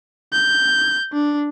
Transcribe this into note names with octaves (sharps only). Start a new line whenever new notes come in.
G6
D4